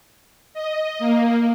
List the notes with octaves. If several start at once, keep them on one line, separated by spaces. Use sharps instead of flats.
D#5
A#3